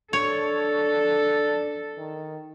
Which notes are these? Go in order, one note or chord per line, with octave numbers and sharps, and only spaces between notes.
D4 A4 C#5
D#3